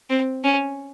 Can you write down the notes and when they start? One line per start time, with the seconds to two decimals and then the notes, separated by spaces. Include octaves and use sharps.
0.10 C4
0.44 C#4